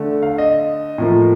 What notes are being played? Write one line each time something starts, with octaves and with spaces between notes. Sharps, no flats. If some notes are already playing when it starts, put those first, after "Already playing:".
Already playing: D3 A3
F5
D#5
A2 F3 A#3